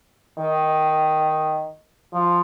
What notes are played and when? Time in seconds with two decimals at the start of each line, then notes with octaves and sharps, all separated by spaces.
0.38 D#3
2.13 F3